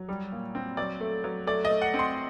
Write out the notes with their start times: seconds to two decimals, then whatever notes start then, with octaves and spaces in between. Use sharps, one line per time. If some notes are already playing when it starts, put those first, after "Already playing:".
Already playing: F#3
0.09 G3
0.32 A#2
0.55 C4
0.77 F#3 D5
1.01 A3
1.24 F#3
1.47 A3 D5
1.65 D#5
1.70 A3
1.82 F#5
1.94 C4
1.99 C6